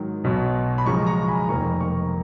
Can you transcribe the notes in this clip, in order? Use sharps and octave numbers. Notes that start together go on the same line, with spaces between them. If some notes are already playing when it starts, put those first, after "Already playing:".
Already playing: G#2 D#3 F#3
B1 B2 F#3
B5
F#2 C#3 F3 G#3 A#5 C#6
A#5 C#6
G#5 B5
F1 F2 D#3 A#3 A#5 C#6
A#5 C#6